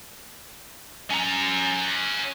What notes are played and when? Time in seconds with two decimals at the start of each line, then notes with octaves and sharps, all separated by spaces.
1.10 C#4 A#5